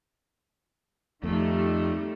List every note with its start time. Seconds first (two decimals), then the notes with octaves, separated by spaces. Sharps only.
1.23 F2 D#3 G3 A3